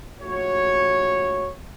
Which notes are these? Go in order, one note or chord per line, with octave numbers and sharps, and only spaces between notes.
A#1 A3 F#4 C#5